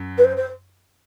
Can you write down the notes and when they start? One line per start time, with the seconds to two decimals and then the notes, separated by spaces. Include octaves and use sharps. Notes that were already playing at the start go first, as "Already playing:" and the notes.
Already playing: F#2
0.17 B4
0.24 C5
0.36 C5